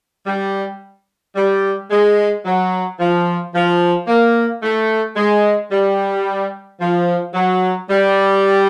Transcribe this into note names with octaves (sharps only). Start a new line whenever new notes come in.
G3
G3
G#3
F#3
F3
F3
A#3
A3
G#3
G3
F3
F#3
G3